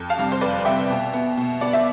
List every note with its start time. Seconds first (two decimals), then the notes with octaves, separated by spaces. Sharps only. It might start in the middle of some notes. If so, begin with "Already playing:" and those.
Already playing: F2
0.10 F5 A5
0.17 C3 G3 C4
0.32 C5
0.41 F2 B4 D5
0.65 C3 G3 C4 E5 G5
0.90 B2
1.14 B3
1.37 B2
1.61 B3 D5
1.73 E5